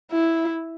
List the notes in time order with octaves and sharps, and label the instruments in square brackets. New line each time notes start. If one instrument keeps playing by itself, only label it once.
[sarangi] E4